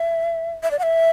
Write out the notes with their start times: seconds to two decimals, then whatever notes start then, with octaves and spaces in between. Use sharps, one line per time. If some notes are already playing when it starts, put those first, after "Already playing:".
Already playing: E5
0.63 E5
0.71 D5
0.79 F#5
0.83 E5